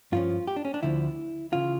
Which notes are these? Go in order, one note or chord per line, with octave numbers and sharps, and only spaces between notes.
G2 F3 C#4 F4
G4
D4
C#4
D4
D2 D3 F3 E4
C#3 E3 F4